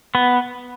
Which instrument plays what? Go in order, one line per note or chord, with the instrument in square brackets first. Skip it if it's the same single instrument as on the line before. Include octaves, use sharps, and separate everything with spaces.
[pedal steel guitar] B3